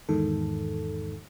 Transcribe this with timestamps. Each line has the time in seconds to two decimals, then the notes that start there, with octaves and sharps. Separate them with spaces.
0.09 E2 G#2 D#3 A4